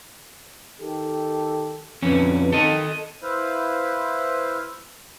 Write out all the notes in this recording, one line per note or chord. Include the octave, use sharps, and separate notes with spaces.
D#3 G4 A4
B1 F2 D3 C#4 B4
D#3 A4 D#5
E4 B4 C5 F5